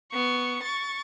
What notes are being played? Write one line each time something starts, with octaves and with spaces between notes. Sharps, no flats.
B3 C#6
C#6 A6